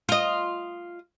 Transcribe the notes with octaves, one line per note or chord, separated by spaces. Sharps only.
F4 D#5